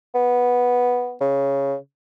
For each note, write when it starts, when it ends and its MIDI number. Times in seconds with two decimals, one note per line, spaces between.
0.15 1.15 59
1.21 1.75 49